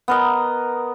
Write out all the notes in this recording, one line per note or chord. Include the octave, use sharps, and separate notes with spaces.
B3 A#4 D#5